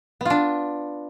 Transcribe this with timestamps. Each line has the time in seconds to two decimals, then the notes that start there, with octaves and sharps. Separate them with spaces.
0.21 B3
0.25 F4
0.30 D4